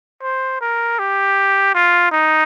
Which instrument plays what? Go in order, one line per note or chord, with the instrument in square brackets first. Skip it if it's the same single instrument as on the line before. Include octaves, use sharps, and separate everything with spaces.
[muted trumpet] C5
A#4
G4
F4
D#4